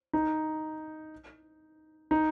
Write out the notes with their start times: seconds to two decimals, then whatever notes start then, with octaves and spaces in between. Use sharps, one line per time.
0.13 D#4
2.11 D#4